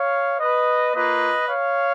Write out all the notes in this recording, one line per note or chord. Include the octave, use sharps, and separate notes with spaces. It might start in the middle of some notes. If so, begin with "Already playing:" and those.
Already playing: C#5 F5
B4 D#5
A#3 F4 B4 D#5
C#5 F5